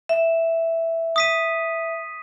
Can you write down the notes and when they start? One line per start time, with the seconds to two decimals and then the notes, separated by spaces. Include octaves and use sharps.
0.09 E5
1.16 D#6 B6 D#7